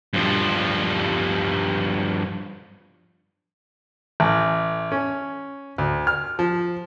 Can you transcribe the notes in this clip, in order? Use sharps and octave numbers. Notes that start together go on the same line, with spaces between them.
G2 F3
A1
C#4
D2
F6
F3